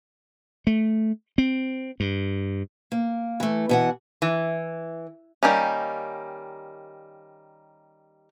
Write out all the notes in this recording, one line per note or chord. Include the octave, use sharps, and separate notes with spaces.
A3
C4
G2
A#3
E3 A3
B2 E3 F#5
E3
D#3 E3 G3 A#3 C#4